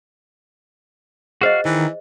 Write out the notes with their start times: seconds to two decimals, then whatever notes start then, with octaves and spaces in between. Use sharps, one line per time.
1.41 F#4 G#4 C5 D#5 F5
1.65 D#3 E3